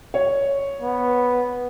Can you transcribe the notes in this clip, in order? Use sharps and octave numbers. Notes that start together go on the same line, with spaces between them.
C#5
B3